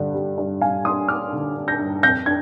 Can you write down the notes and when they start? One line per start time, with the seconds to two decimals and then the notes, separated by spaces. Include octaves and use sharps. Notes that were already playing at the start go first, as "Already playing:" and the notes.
Already playing: G2 D3
0.14 G3
0.38 G2
0.61 G2 F5 G#5
0.85 D4 C6 D#6
1.08 D4 D6 F6
1.32 D3
1.56 D4
1.68 G6 A#6
1.79 G2
2.03 F2 G6 A#6
2.26 D4 G#6